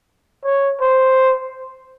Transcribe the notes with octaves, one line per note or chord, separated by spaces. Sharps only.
C#5
C5